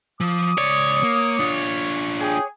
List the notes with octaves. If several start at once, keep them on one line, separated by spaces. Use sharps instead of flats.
F3 D6 D#6
C#2 C#5 D5
A#3
D4 F4
G4 G#4